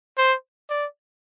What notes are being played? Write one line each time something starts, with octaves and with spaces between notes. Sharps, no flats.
C5
D5